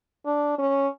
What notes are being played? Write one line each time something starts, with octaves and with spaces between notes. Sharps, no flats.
D4
C#4